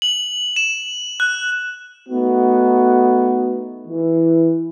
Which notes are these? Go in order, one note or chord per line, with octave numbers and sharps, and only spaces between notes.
F#7
E7
F#6
A3 B3 D#4 F#4
E3